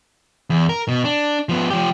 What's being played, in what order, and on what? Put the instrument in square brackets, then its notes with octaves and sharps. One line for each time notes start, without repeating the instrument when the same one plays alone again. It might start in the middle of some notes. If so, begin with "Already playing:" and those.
[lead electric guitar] E2
A#4
B2
D4
F3 B3
F3 G4